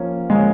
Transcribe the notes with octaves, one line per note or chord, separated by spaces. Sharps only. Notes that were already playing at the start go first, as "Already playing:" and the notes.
Already playing: F3 A#3 C#4
F3 G#3 A#3 C#4